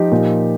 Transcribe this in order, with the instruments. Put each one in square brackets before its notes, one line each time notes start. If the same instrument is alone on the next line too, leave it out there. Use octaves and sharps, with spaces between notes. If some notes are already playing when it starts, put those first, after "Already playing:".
Already playing: [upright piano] F3 D#4 G4
A#2